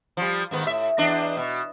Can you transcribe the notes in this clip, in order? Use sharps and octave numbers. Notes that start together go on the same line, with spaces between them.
F3 G3
G#2 D#3 B3
A2 E5
E2 D4 D#5
B2